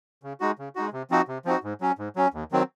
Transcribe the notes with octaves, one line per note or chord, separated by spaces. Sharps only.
C#3
G#3 D#4 F#4
C#3
G#3 D#4 F#4
C3
F3 C4 D#4 F#4
C3
F3 C4 D#4 F#4
G#2
F#3 C#4
G#2
F#3 C#4
D#2
D#3 F#3 C4